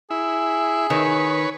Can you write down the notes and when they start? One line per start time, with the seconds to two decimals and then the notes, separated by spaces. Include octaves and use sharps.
0.10 E4 G#4
0.90 D#3 B4 C#5